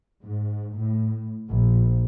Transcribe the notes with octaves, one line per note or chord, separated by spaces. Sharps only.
G#2
A2
A#1